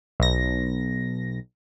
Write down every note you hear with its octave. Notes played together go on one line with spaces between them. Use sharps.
B1 A#6